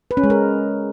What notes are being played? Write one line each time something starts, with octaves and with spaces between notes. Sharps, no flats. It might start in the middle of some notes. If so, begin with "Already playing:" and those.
B4
C#4
G#3
A#4